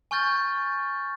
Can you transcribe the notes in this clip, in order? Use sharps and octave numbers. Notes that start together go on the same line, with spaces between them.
G#5 C#6 F6 G6 A6